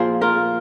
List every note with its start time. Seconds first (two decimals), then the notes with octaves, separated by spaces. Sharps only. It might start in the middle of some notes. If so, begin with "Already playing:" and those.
Already playing: A#2 F3 A#3 G#4 C5
0.21 F4 A#4